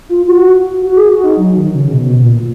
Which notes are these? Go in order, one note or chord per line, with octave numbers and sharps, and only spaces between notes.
F4
F#4
F#4
G#4
F#4
D#4
F#3
D#3
C#3
B2
A#2